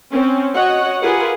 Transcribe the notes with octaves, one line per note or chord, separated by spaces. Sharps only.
C4 C#4
F#4 C#5 D#5 F#5
F4 G4 G#4 A#4 B4 F#5